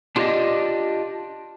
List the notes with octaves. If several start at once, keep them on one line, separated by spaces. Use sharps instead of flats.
D4 F4 G4 C5 D5 D#5